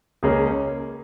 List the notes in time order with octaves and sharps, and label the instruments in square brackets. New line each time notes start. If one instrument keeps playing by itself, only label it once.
[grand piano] C#2 C#3 A#3 C#4 G#4